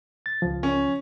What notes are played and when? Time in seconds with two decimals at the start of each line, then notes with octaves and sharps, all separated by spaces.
0.26 A6
0.42 C#2 F3
0.63 C#4